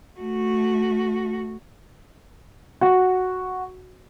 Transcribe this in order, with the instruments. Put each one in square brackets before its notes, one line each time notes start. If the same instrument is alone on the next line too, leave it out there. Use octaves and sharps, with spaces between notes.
[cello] A3 F#4
[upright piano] F#4